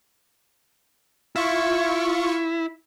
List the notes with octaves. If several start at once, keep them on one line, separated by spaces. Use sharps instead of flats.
E4 F4 C#6